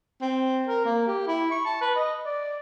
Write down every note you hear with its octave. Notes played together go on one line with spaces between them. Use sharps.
C4
A#4
A#3
G4
E4
C#6
A5
B4
D#5
D5